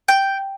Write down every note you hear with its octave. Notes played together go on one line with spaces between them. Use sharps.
G5